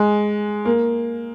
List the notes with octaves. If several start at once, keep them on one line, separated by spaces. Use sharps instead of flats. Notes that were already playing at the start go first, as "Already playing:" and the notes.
Already playing: G#3
A#3